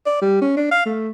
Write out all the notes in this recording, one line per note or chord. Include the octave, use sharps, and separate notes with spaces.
D5
G3
C#4
D4
F5
A3